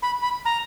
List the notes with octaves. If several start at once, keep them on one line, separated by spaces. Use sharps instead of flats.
B5
B5
A#5